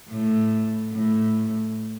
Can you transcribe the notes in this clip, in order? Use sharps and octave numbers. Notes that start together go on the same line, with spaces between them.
A2
A2